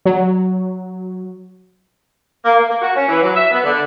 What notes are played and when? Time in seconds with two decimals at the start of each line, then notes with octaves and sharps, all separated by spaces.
0.05 F#3
2.45 A#3
2.58 A#3
2.70 A#3
2.82 F#4
2.95 C#4
3.08 E3
3.22 F#3
3.34 E5
3.51 B3
3.64 D3